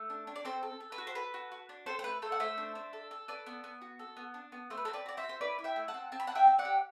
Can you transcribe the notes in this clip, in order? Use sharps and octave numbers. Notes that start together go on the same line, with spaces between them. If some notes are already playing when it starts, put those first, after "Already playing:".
Already playing: A3
D4
D4
D5
C4 A4 C5
A4
A4
B4
F#4
C5
A4 B4
F#4
F#4
D4
C4 A4 C5
C5
A3 B4
A3 A4 C5
F#5
A3 C5 E5
D4
D4
A4
A4
A4 B4 D5
B3
B3
F#4
A4
B3
D4
B3
A3 C5
B4
C4 A4 C5
B4 D5
F#4 D5
C5 E5
F#4
C5
E4 B4 D5
E4
E5 G5
A3
F#5 A5
C4
C4 A5
B5
C4 F#5 A5
E5 G5
C4
D5 F#5
G4